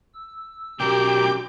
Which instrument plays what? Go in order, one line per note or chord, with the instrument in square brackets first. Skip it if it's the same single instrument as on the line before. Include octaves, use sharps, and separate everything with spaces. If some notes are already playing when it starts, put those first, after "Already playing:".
[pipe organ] E6
[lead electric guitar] B1 A#4 [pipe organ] C#4 F#4 G4 [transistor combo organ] G5 D6